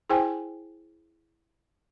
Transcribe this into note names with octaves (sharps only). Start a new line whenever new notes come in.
E4 G#4 C5 G5 G#5